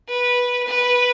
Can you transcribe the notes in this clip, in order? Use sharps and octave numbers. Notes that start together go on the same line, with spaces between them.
B4
B4